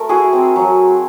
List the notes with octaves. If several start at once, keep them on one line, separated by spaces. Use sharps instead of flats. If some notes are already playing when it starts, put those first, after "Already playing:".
Already playing: A3 A#4
E4 F#4 G#4
C4
F#3